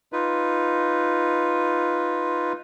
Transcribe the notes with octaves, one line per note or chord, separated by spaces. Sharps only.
D#4 F4 B4